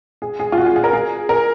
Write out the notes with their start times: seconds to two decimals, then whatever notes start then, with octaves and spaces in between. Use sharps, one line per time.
0.22 G#4
0.40 G#4
0.52 F4
0.57 F#4
0.66 G#4
0.76 G#4
0.84 A#4
0.93 G#4
1.29 A#4